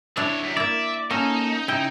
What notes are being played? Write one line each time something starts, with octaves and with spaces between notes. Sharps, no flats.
D3 D4 E4 C#5
F#2
A#3 E4 D5 E5
A#3 C#4 D#4 A4
C#3 E4 G5